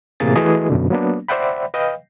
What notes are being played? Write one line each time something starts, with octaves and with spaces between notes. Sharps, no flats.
A2 C3 E3 A#3 G#4 A6
E3 A3 F#4 G#4 B4 D#5
F#2 B2 D3
F#3 A#3 B3 D4
C5 D5 E5 F#5 G5 B5
B4 D#5 F5 G5